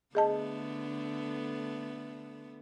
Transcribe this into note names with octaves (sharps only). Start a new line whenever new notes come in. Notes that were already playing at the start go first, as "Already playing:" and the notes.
D3 A3 B3 G#4 D#5 A5